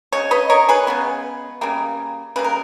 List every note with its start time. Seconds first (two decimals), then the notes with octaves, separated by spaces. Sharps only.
0.12 C#3 G#3 C#5
0.31 B4 D#5
0.50 A#4 C#5
0.69 G#4 B4
0.87 C#3 G#3 B3
1.61 C#3 G3 A#3
2.36 C#3 G3 A#3 B4
2.44 A#4